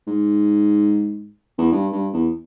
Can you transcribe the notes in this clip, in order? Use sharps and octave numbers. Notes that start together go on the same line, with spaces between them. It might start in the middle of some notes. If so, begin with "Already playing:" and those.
G#2
E2
G2
G2
E2